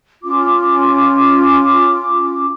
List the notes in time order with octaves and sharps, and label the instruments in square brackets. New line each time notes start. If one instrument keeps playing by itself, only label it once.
[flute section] C#4 F4 D6